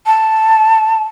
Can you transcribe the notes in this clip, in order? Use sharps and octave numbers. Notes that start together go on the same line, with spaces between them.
A5